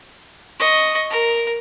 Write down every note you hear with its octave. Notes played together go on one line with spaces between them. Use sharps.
D#5 C#6
A#4